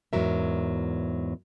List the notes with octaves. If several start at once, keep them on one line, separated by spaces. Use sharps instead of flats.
E2 G#2 F#3 A#4 E5